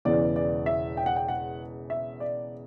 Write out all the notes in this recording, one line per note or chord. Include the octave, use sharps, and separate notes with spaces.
E1 E2 C#3 E3 D5
D5
E5
G5
F#5
G5
F#5
E5
D5